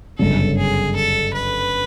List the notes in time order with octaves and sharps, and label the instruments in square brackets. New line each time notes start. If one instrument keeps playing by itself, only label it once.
[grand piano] G1 F#2 C#3 [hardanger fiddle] A4
[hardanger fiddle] G#4
A4
B4